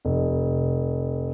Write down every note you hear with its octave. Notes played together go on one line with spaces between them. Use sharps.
F1